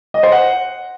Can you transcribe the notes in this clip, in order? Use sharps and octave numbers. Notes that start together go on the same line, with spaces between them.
D#5
C5
F#5